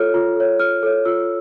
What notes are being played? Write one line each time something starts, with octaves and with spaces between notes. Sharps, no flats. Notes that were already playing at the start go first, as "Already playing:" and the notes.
Already playing: F4 A4 C#5 F6
F4
A4 C#5
F4 F6
A4 C#5
F4 E6